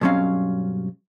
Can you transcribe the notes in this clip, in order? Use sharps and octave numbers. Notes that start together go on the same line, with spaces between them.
B1 G2 F#3 C4 C#4 F5